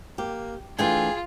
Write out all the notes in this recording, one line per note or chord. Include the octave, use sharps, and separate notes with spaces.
A#3 G4
E3 A3 D4 F4 G#4 G5 G#5